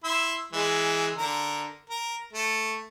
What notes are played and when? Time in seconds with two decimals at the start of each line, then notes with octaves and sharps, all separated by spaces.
0.04 E4 C6 E6
0.53 E3 G#3
1.15 D3 A#4
1.90 A#4
2.33 A3